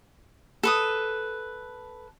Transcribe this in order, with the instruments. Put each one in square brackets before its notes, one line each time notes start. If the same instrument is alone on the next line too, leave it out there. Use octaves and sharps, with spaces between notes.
[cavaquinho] A4 B4 D#6